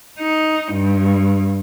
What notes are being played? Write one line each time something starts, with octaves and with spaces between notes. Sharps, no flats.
D#4
G2